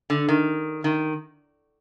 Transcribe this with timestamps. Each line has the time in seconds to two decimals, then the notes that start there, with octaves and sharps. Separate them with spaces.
0.10 D3
0.29 D#3
0.84 D#3